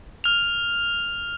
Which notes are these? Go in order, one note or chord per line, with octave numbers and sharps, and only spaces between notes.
F6 F7